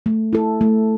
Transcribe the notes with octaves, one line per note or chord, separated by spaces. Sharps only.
A3
E4 A4
A3